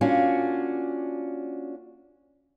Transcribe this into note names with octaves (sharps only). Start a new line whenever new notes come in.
A#3 C#4 D4 F4 F#4